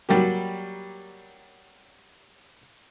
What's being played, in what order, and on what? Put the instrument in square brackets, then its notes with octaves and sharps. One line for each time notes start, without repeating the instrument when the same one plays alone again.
[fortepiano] F#3 G3 A#3 G4